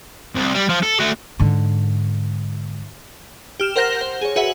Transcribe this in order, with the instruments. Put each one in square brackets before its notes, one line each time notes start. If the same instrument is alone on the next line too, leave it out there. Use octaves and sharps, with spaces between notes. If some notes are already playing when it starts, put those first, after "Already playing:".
[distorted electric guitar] C2
G3
F3
A4
A3 F#4
[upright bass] G#2 D3
[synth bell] G4 F6 E7
A#4 C5 F#5 G6 A#6 E7
C5
G#4 C#5
F#4 G#4 B4 E5 F#5